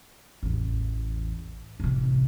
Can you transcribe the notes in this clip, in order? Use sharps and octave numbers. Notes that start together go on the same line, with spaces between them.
A1 E2
A1 C3